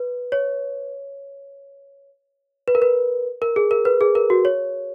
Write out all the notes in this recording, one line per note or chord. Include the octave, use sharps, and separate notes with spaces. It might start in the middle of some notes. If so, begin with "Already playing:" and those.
Already playing: B4
C#5
B4
A#4
B4
A#4
G#4
A#4
B4
G#4
A#4
F#4
C#5